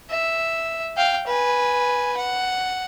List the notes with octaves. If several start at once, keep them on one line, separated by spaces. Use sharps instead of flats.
E5
F5 G5
B4 G#5
F#5